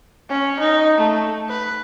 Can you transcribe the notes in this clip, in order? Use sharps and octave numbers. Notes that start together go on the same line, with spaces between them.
C#4
D#4
A3
B4